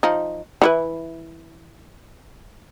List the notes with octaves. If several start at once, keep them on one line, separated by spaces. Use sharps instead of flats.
F3 D#4
E3 E4 B4